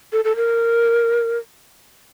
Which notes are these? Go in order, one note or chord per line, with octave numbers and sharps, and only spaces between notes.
A4
A4
A#4